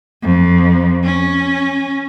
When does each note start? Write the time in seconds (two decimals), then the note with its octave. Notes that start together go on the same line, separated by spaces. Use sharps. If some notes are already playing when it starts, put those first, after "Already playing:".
0.23 F2
1.04 C#4